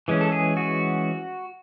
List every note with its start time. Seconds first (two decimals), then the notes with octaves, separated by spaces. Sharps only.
0.08 E3 G#3 C#4
0.21 A4
0.32 G#4
0.57 F#4